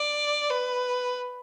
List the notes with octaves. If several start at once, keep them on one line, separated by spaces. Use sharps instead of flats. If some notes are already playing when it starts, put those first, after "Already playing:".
Already playing: D5
B4